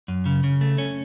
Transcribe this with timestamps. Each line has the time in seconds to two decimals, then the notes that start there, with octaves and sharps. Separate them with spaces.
0.08 F#2
0.26 C#3
0.44 C#3
0.61 A3
0.78 C#4